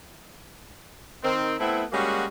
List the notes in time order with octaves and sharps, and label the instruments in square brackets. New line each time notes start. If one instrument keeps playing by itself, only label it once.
[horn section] D#3 C4
A3 B3 C4 E4
G3 G#3 A#3 C#4 F#4